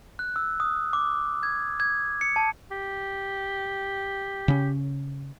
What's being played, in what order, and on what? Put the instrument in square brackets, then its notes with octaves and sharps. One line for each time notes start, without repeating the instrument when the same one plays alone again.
[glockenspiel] F#6
E6
D#6
D6
G#6
G#6
C#7
A5
[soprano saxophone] G4
[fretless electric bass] C#3 C#4